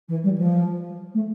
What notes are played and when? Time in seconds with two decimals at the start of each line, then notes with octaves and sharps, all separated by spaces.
0.08 E3
0.23 G3
0.37 F3
1.14 A3